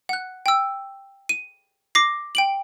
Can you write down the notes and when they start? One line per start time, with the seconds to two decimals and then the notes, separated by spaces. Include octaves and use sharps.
0.09 F#5 F#6
0.46 G5 E6
1.29 D#7
1.95 D6 A#6 C7
2.35 G5 D7 F#7